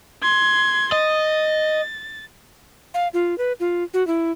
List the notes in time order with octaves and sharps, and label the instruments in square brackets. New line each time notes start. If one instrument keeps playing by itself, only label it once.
[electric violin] C6 G#6
[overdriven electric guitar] D#5 [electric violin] A6
[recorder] F5
F4
B4
F4
F#4
E4